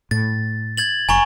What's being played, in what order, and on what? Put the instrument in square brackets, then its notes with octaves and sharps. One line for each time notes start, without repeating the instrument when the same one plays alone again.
[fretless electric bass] A2 [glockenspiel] A6
[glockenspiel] G#6 A6 F#7
[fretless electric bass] F1 [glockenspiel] G#5 A#5 C#6